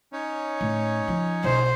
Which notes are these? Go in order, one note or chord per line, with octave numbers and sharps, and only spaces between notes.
C#4 D#4 C#5
A2
F3
B1 C5